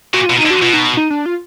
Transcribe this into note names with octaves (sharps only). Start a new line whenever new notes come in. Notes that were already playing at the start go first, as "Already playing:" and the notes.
A#2 F#4
B2 F4
D#4
D3
F#4
B2 F4
D#4
D#4
D4
F4